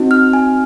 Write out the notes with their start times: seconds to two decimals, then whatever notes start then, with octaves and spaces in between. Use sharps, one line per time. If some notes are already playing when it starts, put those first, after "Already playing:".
Already playing: C4 D#4 F#4
0.11 F6
0.33 G#5